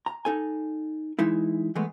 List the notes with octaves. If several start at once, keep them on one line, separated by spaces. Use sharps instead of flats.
A#5
D#4 A4 G#5
E3 G#3 D#4 E4
E3 G#3 A3 B3